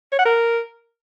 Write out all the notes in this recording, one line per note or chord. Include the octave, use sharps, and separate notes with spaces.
C#5
F#5
A#4